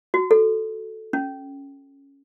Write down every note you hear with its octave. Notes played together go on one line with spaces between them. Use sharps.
F#4
A4
C#4